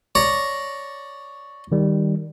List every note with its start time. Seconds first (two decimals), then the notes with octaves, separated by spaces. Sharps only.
0.15 C#5 D5 A#5
1.72 D#3 G3